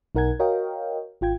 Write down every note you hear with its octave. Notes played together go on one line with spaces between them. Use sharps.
B1 D#4 A#4 F#5 G#5 G#6
F#4 A#4 C#5 D#5 F5 G5
G#1 F4 G5 G#6